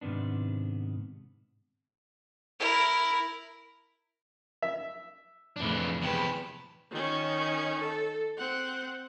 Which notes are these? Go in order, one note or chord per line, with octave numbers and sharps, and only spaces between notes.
G#2 C3 D#3 B3 D4
E4 A#4
E5
F2 A2 C#3 E3 D4
E2 C3 B4 G5 A5
D#3 C#4
A4
C4 F#5